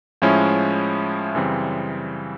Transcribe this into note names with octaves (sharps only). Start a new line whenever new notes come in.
A2 F3 G#3 C#4 E4
F#2 C#3 E3 G3 C4